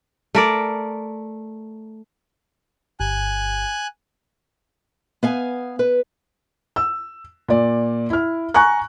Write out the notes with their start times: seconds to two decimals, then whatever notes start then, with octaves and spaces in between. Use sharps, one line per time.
0.35 A3 A#4 D5
3.00 G1 G#5 F#6
5.23 B3 F5 G#5
5.79 B4
6.76 E6
7.48 A#2 D5
8.10 E4 F6
8.54 G#5 A#5 C#6 F#6